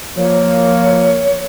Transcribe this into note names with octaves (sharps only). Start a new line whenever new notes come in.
F3 A#3 F4 C#5